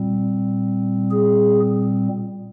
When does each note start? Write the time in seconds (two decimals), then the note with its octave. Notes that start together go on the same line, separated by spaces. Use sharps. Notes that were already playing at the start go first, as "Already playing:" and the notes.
Already playing: A#2 G3 C4
1.11 G#4